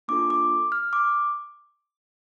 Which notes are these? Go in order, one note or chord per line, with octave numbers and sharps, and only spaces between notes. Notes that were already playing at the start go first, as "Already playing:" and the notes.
A#3 D4 F4 A4 D6
D6
F6
D6